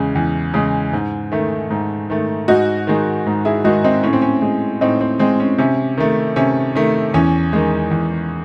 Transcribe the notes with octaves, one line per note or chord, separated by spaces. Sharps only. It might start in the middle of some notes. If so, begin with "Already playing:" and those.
Already playing: E2 C#3 G#3
E2
C#3 G#3
G#2
D#3 A3
G#2
D#3 A3
G#2 D#4 F#4
D#3 G#3
G#2
E4 G#4
D#3 G#3 D#4 F#4
C4 D#4
A2 C#4
C4
C#4
G#3
A2 C4 D#4
C4
G#3 C4
C#4
C3 C#4
D#3 A3
C3 C#4
D#3 A3
E2 C#4
D#3 G#3
E2